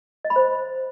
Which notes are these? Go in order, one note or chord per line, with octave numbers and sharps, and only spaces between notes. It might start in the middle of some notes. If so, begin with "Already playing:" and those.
D#5
B5
C5